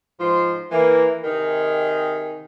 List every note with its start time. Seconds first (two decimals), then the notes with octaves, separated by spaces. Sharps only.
0.20 G#2 F3 C6
0.72 E3 A#3
1.24 C3 D#3 D#4 G#4